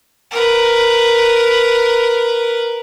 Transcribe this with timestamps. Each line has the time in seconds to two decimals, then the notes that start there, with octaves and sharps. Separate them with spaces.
0.31 A#4 B4